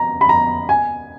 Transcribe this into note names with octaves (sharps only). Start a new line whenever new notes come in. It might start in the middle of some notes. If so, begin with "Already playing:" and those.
Already playing: A#5
B5
A#5
G#5